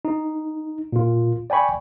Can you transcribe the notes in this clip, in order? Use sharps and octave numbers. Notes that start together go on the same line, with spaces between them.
D#4
A#2 F4
D5 G5 G#5 B5 C#6